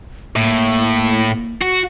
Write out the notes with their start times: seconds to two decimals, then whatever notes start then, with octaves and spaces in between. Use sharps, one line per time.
0.36 A2 A#3
1.62 F#4